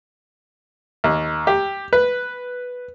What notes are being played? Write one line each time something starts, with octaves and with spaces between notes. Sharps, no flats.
D#2
G4
B4